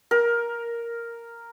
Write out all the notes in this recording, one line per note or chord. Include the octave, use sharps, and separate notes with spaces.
A#4